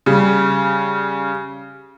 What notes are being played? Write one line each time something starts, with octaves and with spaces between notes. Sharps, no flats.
C#3 G3